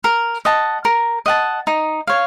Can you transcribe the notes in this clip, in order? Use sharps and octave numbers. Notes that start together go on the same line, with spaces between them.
A#4
D#5 F#5 A5
A#4
D#5 F#5 A5
D#4
C#5 F5